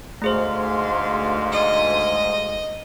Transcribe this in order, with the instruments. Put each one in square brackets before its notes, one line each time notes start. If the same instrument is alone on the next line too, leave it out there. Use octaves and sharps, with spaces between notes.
[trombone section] D2 G#2 [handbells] A3 G#4 C5 [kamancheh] F5 C6
[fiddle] D#5